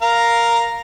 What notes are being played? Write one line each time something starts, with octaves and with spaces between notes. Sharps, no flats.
A#4 F5 A#5